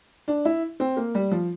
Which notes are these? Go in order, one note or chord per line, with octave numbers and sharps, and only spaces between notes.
D4
E4
C4
A#3
G3
F3